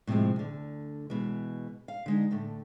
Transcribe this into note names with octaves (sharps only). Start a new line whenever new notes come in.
A2 C3 D#3 F3 G#3
D2 D3
B2 E3 G#3
F5
D3 G#3 D#4
A2 D3 A3